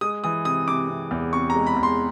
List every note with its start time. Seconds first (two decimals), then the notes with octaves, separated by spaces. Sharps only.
0.01 G#3 D#6
0.24 E3 D#6
0.45 C3 D#6
0.68 C3 D6
0.89 C3
1.11 E2
1.33 C3 C#6
1.50 A#5
1.56 G#3
1.67 B5
1.76 E2
1.83 C6